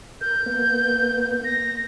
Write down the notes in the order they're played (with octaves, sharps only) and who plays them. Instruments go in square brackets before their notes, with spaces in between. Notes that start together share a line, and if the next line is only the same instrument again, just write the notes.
[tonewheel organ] A#4 [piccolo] G6
[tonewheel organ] A#3 B3
[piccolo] A#6